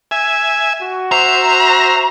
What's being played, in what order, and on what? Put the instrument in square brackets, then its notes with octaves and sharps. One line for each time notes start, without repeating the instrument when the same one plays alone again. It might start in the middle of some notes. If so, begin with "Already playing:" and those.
[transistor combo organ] E5 G#5
[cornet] F#4
[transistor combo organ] C5 E5 [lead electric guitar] A#5